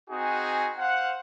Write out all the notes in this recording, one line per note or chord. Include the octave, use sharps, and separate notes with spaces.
C4 D#4 F#4 G#4 G#5
C5 F5 F#5